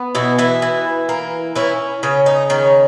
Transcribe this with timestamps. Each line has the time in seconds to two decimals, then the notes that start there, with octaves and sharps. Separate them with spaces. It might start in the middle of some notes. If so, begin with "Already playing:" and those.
Already playing: B3
0.15 B2 E3 E4
0.39 E3 E4
0.62 E3
1.09 A#3
1.55 E3 C#4 E4
2.03 C#3 C#4
2.26 D#4
2.50 D#3 C#4